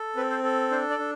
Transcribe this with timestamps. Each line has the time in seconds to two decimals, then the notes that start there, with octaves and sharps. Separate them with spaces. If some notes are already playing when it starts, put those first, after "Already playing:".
Already playing: A4
0.16 C4 B4
0.30 C5
0.43 A4
0.71 D4 C5
0.90 D5
0.98 D4